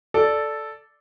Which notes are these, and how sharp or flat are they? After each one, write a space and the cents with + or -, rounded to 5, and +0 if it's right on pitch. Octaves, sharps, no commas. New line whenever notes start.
A4 -5 D5 +0